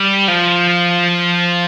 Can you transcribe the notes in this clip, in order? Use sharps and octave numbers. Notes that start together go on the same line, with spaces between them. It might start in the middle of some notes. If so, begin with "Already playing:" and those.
Already playing: G3
F3